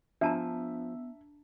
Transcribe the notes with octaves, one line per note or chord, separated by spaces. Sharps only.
F3 B3 D4 E5 A5 A#5